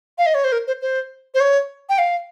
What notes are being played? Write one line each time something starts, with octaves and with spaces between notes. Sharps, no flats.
F5
D#5
C#5
C5
A#4
C5
C5
C5
C#5
G5
F5